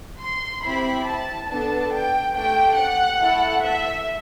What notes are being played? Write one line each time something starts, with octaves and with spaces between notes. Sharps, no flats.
C6
C4 E4 G4 B5
A5
B3 D4 A4 A5
G5
A3 D4 G4 G5
F#5
A3 E4 A4
E5